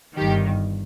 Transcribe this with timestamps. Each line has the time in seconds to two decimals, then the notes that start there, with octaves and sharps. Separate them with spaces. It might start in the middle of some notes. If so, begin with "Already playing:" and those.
0.16 G1 G2 D#3 G4